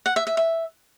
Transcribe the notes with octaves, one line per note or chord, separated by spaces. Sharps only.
F#5
E5
E5
E5